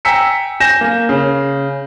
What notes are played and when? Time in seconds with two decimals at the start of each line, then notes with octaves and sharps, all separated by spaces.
0.05 G5 G#5 A#5 E6 B6 C#7
0.60 G#5 G6 A#6 E7
0.81 A#3
1.09 C#3